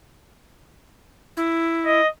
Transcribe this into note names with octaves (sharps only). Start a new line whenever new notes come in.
E4
D#5